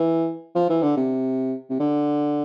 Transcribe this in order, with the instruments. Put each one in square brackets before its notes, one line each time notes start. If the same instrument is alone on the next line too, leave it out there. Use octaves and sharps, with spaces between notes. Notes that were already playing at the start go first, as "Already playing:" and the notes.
Already playing: [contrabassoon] E3
F3
E3
D3
C3
C3
D3